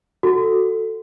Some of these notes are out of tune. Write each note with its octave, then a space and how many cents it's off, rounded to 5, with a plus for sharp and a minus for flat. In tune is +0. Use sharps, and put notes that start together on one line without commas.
F#4 +0 A4 +5